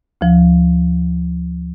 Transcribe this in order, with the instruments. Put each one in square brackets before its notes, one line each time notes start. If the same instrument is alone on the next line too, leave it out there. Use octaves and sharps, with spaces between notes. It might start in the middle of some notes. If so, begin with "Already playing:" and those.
[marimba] D2 F3